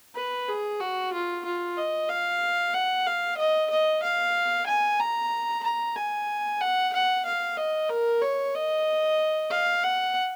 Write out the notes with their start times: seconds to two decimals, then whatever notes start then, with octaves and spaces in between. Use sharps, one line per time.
0.15 B4
0.48 G#4
0.80 F#4
1.13 F4
1.45 F4
1.77 D#5
2.09 F5
2.74 F#5
3.06 F5
3.37 D#5
3.70 D#5
4.03 F5
4.66 G#5
5.00 A#5
5.63 A#5
5.96 G#5
6.61 F#5
6.93 F#5
7.25 F5
7.57 D#5
7.89 A#4
8.22 C#5
8.54 D#5
9.50 F5
9.83 F#5